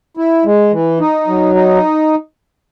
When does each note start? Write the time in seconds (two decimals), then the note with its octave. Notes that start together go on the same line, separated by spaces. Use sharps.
0.17 E4
0.45 G#3
0.72 E3
1.00 D#4
1.27 F#3
1.55 D#4